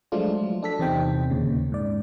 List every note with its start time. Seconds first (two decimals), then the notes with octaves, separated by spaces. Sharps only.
0.12 F3 F#3 G#3 A3 D4 F4
0.43 F#3
0.62 D4 A4 B6
0.79 E2 C3 C4 D#4 G5
1.30 D#2 A#2 C#3
1.72 G#2 D5